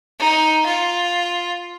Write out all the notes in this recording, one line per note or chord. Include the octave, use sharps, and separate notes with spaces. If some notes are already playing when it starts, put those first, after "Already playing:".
D#4
F4